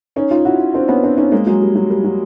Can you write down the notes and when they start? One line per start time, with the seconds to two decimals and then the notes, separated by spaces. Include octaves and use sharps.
0.16 C#4 D#4
0.31 D#4 F4
0.45 E4 F#4
0.74 C4 D4
0.88 B3 C#4
1.04 C4 D4
1.18 C#4 D#4
1.32 G#3 A#3
1.47 F#3 G#3
1.62 G3
1.75 F#3
1.90 G3
2.04 F#3